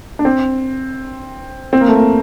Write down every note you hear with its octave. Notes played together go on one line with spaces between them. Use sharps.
D4
C4
C4
A#3
A3
A#3